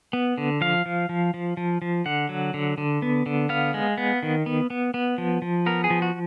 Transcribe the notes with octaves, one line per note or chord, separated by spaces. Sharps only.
B3
D3
F3 F5
F3
F3
F3
F3
F3
D3 F#5
F#3
D3
D3
B3
D3
B3 F5
G#3
B3
D#3
B3
B3
B3
F3
F3
B3 A#4
G#4
F3
F#4